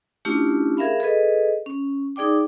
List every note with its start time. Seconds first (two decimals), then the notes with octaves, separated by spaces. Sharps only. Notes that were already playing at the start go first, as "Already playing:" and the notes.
0.25 A3 C#4 D4 E4 F4 G4
0.77 G#4 A#4 E5 F5 B5
1.00 G#4 A4 B4 D#5
1.66 C#4
2.16 D#4 G#4 D5 G5 D6